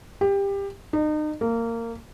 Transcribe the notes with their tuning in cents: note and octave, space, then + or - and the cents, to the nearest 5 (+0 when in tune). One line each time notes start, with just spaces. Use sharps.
G4 +20
D#4 -35
A#3 -20